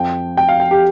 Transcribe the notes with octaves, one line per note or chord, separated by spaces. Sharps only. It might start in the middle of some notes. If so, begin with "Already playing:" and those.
Already playing: F2 F3 C4 G5
G5
F5
G5
G4